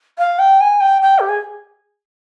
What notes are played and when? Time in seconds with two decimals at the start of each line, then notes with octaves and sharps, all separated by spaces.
0.18 F5
0.39 G5
0.61 G#5
0.80 G5
1.02 G5
1.19 G4
1.28 G#4